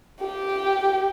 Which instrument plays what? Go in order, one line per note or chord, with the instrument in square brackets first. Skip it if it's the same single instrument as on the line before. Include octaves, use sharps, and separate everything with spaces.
[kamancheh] G4